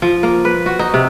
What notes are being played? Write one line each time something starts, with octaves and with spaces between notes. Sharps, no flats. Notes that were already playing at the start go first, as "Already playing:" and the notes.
F3
A#3
B4
F#4
D#4
C3